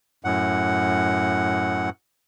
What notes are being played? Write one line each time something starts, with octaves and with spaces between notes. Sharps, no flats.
F#2 A2 F#5